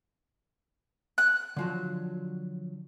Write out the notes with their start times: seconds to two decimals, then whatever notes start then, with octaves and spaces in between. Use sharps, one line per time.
1.18 F#6
1.57 D3 F3 F#3